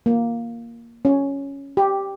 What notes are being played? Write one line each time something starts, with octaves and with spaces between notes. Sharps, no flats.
A#3
C#4
G4